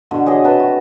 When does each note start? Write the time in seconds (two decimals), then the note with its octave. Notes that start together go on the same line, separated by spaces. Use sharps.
0.11 B2 D3
0.26 G4 G#4 C#5 D#5
0.44 C3 B4 A5
0.60 F#4